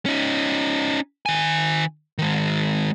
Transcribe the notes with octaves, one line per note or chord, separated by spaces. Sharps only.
C#4 D#4
D#3 G#5
D#3 G#3